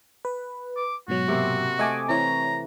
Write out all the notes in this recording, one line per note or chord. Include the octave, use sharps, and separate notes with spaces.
B4
D6
G#2 B2 F#3 F#4
C3 A#3 C4
A3 D#5 G#5 D6
E3 C4 C#5 A#5